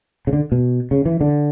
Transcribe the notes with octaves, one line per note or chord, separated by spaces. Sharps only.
C#3
D3
B2
C#3
E3
D3